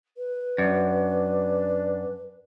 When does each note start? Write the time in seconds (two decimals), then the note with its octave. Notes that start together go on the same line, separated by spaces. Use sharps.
0.17 B4
0.58 F#2 D4